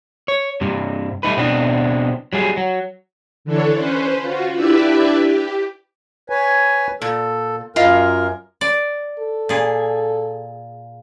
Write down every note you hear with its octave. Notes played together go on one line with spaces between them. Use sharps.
C#5
G2 C3
G3 A3 D#4 B4
B2 B3 C4 D4
F#3 G3 G#4
F#3
D3 E3 D4 A4 C#5
C#4 B4 C5
F4 F#4
D4 E4 G4 B4 D5 E5
G4
B4 C#5 G#5
A#2 A4
F#2 F4 A#4 D#5 F5
D5
A4
A#2 G#4